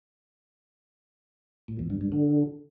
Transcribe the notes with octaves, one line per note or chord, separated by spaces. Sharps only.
A2
E2
G2
G2
D3